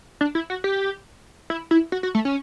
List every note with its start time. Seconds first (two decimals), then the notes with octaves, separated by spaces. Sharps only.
0.21 D4
0.35 E4
0.50 F#4
0.64 G4
1.50 E4
1.71 E4
1.92 F#4
2.03 F#4
2.15 A3
2.25 C#4